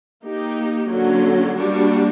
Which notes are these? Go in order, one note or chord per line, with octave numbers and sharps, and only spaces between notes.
A#3 D#4 G4
D3 F#3 A#3 C#4
G3 A#3 D4 F#4